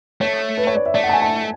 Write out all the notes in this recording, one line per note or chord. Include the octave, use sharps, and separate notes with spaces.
A3 C#5
B4
C#5
D5
E5
A3 D5
F#5
A5
G#5
A5